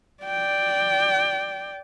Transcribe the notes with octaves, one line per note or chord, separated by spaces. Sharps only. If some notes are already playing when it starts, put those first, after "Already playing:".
D5 G5